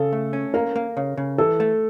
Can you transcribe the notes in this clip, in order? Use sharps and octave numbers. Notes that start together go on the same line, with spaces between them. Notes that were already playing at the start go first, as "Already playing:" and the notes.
Already playing: C#3 A4
A3
C#4
A#3 A#4
A#3
C#3
C#3
E3 A4
A3